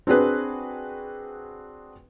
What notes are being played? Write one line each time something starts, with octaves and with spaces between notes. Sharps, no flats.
C4 D4 F#4 G#4 B4